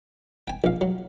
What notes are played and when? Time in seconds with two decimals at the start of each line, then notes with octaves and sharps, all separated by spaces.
0.48 G5 G#5
0.64 A#1 F5
0.81 F#3